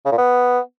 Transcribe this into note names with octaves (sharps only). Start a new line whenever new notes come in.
C#3
A#2
B3